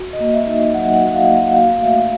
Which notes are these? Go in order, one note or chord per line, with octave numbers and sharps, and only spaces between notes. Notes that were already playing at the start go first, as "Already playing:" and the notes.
Already playing: F#4
D#5
A#3
E5
D#4
F#3 F#5
F#5
F#4
F5
A#3
F#5
F#4 F5
A3 E5